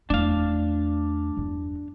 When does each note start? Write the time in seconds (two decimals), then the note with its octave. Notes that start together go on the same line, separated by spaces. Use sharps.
0.10 E2 A3 D4 F5
1.37 E2 G2